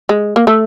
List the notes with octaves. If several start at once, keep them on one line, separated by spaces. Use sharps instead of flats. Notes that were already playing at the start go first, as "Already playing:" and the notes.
G#3
A#3
A3